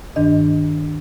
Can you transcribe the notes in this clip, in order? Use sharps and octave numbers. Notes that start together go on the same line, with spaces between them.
G2 D#3 D4 D#5